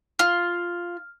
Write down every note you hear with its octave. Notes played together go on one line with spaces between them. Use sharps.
F4 F6